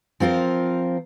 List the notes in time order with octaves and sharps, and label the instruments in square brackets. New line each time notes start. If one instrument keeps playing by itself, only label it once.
[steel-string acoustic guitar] F3 C4 F4 A#4